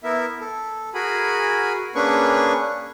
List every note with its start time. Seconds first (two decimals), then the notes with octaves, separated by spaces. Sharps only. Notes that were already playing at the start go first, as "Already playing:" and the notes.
0.04 B3 E4 A#4 E5
0.40 A4
0.94 F#4 G#4 A#4 G#5 B5
1.95 A#3 C#4 D4 G#4 B4 C#6